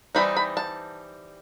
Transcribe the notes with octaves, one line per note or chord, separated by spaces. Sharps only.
E3 G3 C4 D#4 B5
B5
A5